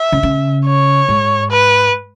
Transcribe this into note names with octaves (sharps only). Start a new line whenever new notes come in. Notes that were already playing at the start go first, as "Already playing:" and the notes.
Already playing: E5
C#3
C#3
C#5
G#2
B4